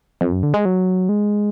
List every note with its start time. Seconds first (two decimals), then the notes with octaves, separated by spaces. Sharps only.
0.21 F2
0.32 F#2
0.43 D3
0.54 G#3
0.65 F#3
1.09 G#3